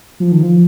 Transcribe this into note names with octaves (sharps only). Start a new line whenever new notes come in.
F3
D#3
F3